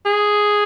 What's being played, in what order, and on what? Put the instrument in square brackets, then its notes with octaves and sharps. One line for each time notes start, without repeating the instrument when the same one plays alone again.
[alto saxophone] G#4